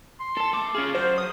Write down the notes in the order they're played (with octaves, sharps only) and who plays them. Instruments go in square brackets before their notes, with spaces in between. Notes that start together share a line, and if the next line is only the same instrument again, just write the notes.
[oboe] C6
[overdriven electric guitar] A4 A5
[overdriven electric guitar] A3 [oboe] D6
[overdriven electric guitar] C#4 G#4 [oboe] F4
[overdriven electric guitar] F#3 [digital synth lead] C5
[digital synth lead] D#6